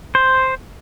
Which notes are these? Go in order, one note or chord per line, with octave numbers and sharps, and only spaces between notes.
C5